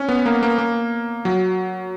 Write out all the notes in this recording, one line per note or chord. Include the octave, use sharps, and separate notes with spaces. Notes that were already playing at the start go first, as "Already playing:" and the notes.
Already playing: C#4
B3
A#3
A#3
A#3
F#3